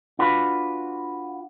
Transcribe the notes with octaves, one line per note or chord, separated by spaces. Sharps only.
D4 F4 F#4 B4